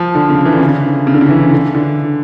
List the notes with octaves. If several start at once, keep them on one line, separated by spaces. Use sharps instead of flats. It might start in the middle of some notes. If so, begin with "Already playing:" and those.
Already playing: F3
D3
C#3
E3
D3
C#3
D3
C#3
D3
C#3
E3
D3
D3